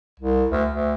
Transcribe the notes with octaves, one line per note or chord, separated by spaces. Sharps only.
C2
D2
D2